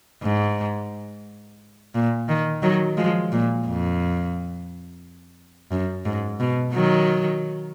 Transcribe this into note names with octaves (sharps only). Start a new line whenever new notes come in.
G#2
A#2
D#3
D#3 F#3
F3 G#3
A#2
F2
F#2
G#2
B2
D#3 F#3